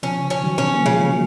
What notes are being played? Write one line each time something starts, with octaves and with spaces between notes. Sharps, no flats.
C#3 F3 C#4
C#4
D#3 F#3
C#4
A#3
C#3 F3 G#3
F#3 A#3